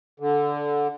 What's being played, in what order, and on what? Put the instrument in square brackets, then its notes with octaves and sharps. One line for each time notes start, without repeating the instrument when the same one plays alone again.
[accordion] D3